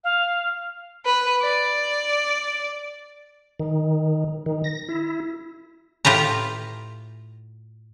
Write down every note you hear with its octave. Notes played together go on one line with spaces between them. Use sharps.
F5
B4
D5
D#3
D#3
A#6
E4
A2 F4 G4 B4 A#5